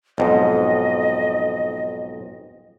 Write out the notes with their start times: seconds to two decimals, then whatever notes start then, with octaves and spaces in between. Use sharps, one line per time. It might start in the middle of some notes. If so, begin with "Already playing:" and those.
0.18 B1 F2 G#2 D#5